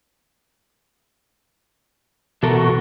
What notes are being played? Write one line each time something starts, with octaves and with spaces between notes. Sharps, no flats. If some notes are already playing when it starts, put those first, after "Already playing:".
B2 E3 F#4 A4 A#4